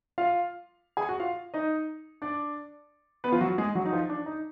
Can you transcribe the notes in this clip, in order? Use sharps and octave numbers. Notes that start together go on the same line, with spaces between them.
F4 F5
G#4 G#5
F#4 F#5
F4 F5
D#4 D#5
D4 D5
B3 B4
F3 F4
F#3 F#4
G#3 G#4
F#3 F#4
D#4
F3 F4
D4
D#4